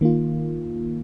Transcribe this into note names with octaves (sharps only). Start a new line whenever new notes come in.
D#3 A#3 F4